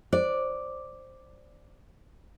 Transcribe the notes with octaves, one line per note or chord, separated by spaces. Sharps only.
C5 D5